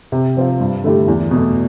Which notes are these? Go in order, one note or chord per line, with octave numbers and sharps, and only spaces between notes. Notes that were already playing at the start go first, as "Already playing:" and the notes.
C3
F3 C4 F4
G2
D3 A3 E4 G4
E2
B2 A3